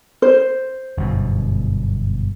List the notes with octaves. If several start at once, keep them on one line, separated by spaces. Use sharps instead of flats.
C5
G1 F#2 B2